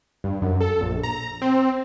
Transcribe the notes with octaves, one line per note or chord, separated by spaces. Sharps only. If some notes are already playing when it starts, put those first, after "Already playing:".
G2
F#2
A4
A#1
A#5
C4